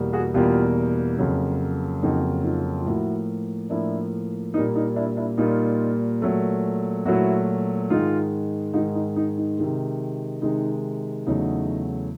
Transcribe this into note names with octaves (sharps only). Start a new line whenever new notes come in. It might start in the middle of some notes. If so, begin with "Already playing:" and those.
Already playing: E2 B2 G3 A#3
F#4 G#4
E2 B2 G3 A#3 F4 G4
F2 C#3 F#3 A#3
F2 C#3 F#3 A#3 D#4
D#4 F4
F4
A2 F3 A#3 E4 F#4
A2 F3 A#3 D4 E4
A#2 G3 A#3 D#4
D#4
D4 E4
D4 E4
A#2 G3 A#3 D#4 F4
A#2 F#3 A3
A#2 F#3 A3 E4 F#4
G#2 D#3 G#3 D#4 F4
G#2 D#3 G#3 D#4
D#4
D#4
D#4
C3 D#3 G#3
C3 D#3 G#3 D#4
E2 C#3 F#3 A3 D#4